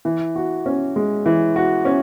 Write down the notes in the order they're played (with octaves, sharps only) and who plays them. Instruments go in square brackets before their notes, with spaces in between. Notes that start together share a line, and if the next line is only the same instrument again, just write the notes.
[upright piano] E3
F#4
C#4
G#3
E3
F#4
C#4